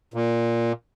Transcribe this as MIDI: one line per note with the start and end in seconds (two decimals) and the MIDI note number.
0.14 0.72 46